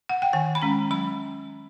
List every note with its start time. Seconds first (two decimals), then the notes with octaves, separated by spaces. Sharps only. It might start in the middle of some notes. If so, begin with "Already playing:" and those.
0.09 F#5
0.22 G5
0.33 D#3 G#5
0.55 B5
0.62 G#3 C#4 A#5
0.91 F#3 B5